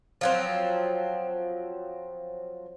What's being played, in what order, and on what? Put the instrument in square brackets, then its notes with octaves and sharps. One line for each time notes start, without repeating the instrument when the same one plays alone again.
[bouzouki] F3 F#3 C4